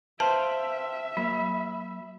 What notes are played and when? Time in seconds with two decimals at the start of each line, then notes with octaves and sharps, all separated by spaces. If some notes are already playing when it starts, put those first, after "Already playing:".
0.20 B4 C5 E5 F5 G5 A5
1.17 F#3 A#3 B5